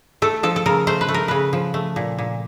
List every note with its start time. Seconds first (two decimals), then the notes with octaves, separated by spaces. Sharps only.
0.22 A3 A4
0.43 F3 A4
0.56 A4
0.66 C#3 A#4
0.87 A3 C5
1.01 B4
1.09 A3
1.14 A#4
1.28 C#3 B4
1.53 F3
1.74 A3
1.96 A#2
2.18 A#2